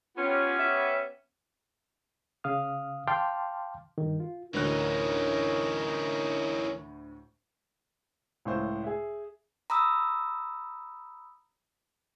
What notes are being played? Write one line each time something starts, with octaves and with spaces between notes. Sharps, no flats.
B3 C#4 F4 G4
E5
C#3 F5 D#6 F6
F5 G5 A5 C6 D6 F6
G2 D#3
F4
D2 A2 E3 C#4 D#4 A#4 C#5 F#6
C#2 A2 C5
G#4 E5
A#5 B5 D#6 E6